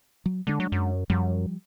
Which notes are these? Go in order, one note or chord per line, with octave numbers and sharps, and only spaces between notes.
F#3
D3 G#3 D4
F#3
F#2
F#2 F3 G3